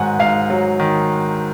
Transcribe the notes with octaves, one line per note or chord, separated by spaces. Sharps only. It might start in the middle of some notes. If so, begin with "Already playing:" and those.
Already playing: G#2 D#3 F#3 F#5 G#5
G#2 F5
F#3
D#3